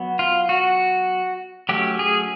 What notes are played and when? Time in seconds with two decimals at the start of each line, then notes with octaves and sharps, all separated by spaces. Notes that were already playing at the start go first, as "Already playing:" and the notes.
Already playing: F#3 B3
0.19 F4
0.49 F#4
1.69 F#3 A3 C#4 G4
1.99 G#4